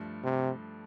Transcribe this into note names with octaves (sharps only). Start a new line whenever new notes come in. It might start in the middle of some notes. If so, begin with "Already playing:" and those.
Already playing: G2 F3 A3
C3